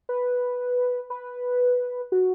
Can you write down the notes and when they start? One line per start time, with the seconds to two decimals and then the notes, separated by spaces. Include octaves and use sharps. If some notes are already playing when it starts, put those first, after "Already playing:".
0.09 B4
1.10 B4
2.12 F#4